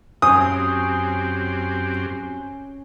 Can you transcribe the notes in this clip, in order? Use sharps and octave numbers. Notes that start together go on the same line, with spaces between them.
F#2 C4 C#4 G4 C#5 D#6